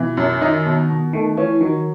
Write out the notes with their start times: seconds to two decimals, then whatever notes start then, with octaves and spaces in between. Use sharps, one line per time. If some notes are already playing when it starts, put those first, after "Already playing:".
Already playing: B2 E3
0.17 F#2
0.41 D#3 D#4
0.66 B2
0.89 B2
1.13 D#3 A3
1.37 E3 C#4
1.61 D#3 F#3